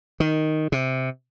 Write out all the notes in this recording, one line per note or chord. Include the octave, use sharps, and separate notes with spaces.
D#3
C3